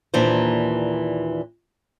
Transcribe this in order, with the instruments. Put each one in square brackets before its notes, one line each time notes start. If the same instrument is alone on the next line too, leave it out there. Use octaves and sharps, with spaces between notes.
[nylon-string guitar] D#2 A#2 E3 D4 C5